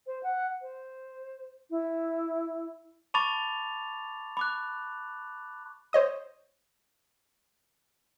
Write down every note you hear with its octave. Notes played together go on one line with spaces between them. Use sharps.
C5
F#5
C5
E4
A5 B5 C#6 D6 A6 F7
B5 D6 F#6
C5 C#5 D#5 D#6